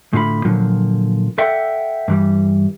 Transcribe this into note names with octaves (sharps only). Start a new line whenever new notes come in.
A2 D3 F4 F5 B5
A#2 D3 F3 F#3
A4 D5 E5 F#5 G5
G2 E3 G3